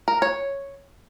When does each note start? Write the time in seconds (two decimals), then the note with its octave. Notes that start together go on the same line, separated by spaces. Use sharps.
0.08 A#4
0.22 C#5